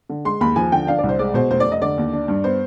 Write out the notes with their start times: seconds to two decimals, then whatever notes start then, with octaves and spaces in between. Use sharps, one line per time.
0.09 D3
0.25 G#3 C6
0.41 D#2 B5
0.56 F3 G#5
0.72 D3 G5
0.87 D4 F5
0.98 D5
1.04 C2
1.09 C5
1.19 G#3 D5
1.34 B2 C5
1.51 F1 C5
1.60 D5
1.66 F1
1.72 D#5
1.81 D3 D5
1.98 D#2
2.13 D4
2.28 G2
2.44 B3 C5